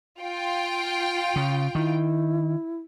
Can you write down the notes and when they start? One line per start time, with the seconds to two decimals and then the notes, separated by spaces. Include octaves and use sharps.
0.20 F4 G5
1.36 C#3
1.75 D#3 E4